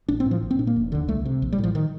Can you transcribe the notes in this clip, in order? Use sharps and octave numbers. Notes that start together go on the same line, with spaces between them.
A1 D4
C4
A2
F3
A#1
C4
A#2 D4
A#3
F1
D#2 D3
C2 A3
C3
A#1
G3
A2
F3
D#3